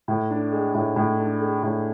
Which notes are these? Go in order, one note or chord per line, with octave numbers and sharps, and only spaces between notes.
A2
D4
G#3
A2
A2
D4
G#3
A2